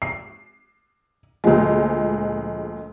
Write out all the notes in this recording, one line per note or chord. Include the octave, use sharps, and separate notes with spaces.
C7
D2 A#2 F3 G#3